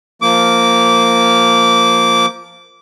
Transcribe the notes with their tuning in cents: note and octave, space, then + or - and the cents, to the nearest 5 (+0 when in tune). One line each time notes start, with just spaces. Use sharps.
F3 -5 A#3 -5 D6 -15